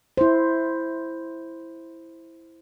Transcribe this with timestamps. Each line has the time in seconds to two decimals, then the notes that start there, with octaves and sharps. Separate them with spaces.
0.17 E4 C5